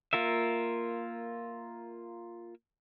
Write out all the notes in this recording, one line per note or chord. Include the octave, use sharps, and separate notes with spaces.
A#3 F4 A#4 E5